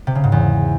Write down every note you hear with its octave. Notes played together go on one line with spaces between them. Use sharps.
C3
C#3
G#2
E2